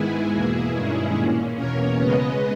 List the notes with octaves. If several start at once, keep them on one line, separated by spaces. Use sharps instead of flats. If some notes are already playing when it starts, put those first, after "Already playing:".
Already playing: G#2 D#3 G#3 B3 E4 G#4
E2 B2 A#3
G2 D#3 G#3 C#4 E4 G#4
A#2 A#3 C#4
E2 B2 A#3 C#4 A#4 C#5
C#3 G#3 B3 B4 D#5